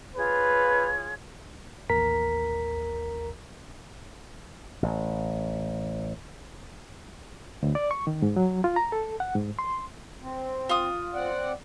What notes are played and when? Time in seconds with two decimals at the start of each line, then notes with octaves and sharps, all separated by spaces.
0.16 F4 G#4 B4 C#5
1.90 A1 D#2 A#4 A#5 B6
4.82 A1
7.63 D2
7.75 D5
7.91 C#6
8.07 D#3
8.22 G#2
8.36 F#3
8.64 F4
8.76 A#5
8.92 A4
9.20 F#5
9.35 G#2
9.59 C6
10.22 C4
10.69 F4 D#6
11.14 C4 D5 F#5